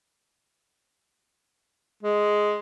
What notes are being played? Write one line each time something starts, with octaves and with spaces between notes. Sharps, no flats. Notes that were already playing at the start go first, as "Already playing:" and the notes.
G#3